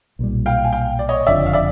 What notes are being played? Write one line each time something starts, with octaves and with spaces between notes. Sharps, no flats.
B1 A#2 G3
F5 G5
G#5
F5 G5
D5
C#5 D#5
F#1 F2 D3 F3 D5 E5
F5
D5 E5